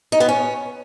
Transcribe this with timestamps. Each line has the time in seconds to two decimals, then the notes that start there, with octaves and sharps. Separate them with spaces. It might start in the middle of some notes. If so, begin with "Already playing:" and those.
0.12 D#4
0.20 B3
0.29 C#4